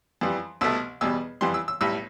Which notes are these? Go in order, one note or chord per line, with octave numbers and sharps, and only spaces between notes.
F2 E3 G3
C2 B2 A3 E6
E2 B2 G3 E6
F2 E3 G3 C6
E6
E6
B1 A2 G3 E6